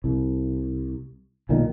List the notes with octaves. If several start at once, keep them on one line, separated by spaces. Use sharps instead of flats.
C2
B1 A#2 D#3